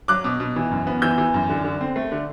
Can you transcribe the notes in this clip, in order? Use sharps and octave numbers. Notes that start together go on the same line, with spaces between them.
F#3 D6 F#6
B2
B2
E3
F#2
B3
E3 E6 G6
E3
F#2
D3
D3
C4
A3
D3